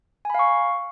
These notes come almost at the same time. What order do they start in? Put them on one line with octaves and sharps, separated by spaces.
G#5 B5 F5 C#6